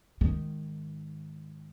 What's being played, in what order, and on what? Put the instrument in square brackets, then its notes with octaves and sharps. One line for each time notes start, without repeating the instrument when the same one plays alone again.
[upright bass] G#2 D#3